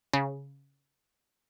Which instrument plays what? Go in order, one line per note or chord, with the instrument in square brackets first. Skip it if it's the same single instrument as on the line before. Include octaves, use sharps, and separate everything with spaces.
[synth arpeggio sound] C#3